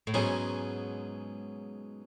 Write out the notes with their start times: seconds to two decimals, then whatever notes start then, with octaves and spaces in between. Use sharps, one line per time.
0.07 A2
0.14 G#2 B2 F#3 C#4 G#4